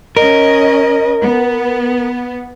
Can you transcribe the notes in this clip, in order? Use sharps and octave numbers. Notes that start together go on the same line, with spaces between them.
C#4 A#4 D#5
B3